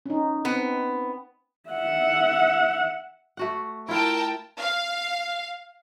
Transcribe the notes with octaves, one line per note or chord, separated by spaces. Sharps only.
C#4 D#4
B3 C4
E5 F#5
A3 F#4 F#5
E4 F4 A#4 G5 A5
F5